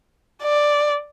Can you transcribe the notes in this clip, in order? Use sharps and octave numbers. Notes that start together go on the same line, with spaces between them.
D5